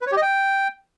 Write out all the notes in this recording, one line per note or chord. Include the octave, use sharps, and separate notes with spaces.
B4
C#5
G4
D#5
G5